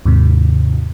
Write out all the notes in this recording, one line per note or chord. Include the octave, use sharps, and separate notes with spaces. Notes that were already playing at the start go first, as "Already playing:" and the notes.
D#2 G#2 C3